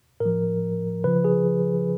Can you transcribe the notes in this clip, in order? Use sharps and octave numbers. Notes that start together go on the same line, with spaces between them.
A2 A#4
F3
C#3 F3 B4
G#4